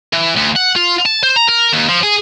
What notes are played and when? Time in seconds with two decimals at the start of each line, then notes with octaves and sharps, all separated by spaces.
0.13 E3
0.36 D2
0.56 F#5
0.76 F4
1.05 A5
1.23 C5
1.36 A#5
1.49 A#4
1.73 D#2
1.89 F3
2.03 G#4